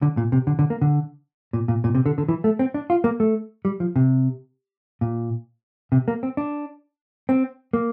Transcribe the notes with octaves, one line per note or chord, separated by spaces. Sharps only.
D3
A#2
C3
D3
D3
A#3
D3
A#2
A#2
A#2
C3
D3
D3
E3
A3
C4
D4
F4
A#3
A3
G3
F3
C3
A#2
C3
A#3
C4
D4
C4
A#3